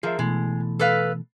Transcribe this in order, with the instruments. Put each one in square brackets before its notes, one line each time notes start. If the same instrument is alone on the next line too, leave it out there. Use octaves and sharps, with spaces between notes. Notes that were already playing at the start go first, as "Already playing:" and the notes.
[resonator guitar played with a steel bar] F3 [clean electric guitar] G#4 A#4 E5
[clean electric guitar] B2 E3 A3 [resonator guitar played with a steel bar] G#3
[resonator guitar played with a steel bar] A4 B4 F5